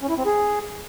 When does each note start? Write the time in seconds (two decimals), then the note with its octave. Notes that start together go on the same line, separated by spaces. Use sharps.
0.01 C#4
0.09 E4
0.17 C4
0.26 G#4